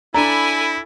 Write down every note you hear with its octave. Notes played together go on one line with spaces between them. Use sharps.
D4 E4 A4 G#5 A#5 B5